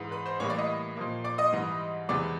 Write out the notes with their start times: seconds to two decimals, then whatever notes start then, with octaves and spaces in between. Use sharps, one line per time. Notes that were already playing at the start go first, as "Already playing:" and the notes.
Already playing: G#2 E3 G#3
0.11 B4 B5
0.26 C5 C6
0.40 A2 E3 G3 A#3 C#5 C#6
0.50 D5 D6
0.58 D#5 D#6
0.97 A#2 F3 A#3
1.24 D5 D6
1.38 D#5 D#6
1.52 G#2 E3 G3
2.09 E2 C3 E3 G#3 D5 D6